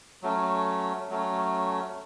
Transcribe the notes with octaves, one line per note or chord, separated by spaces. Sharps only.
F#3 A3 C#4
F#3 A3 C#4